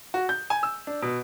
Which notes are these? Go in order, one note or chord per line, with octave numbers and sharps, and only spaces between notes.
F#4
G6
G#5
E6
D4
B2